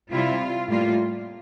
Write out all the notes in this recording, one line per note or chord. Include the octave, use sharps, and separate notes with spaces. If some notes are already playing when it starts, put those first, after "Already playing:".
C3 G3 C4 E4 F4
A2 G3 A#3 F4